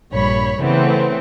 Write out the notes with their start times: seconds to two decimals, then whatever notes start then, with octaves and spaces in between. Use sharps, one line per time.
0.12 A#1 G2 C#5 B5
0.60 C#3 E3 A3 B3 C4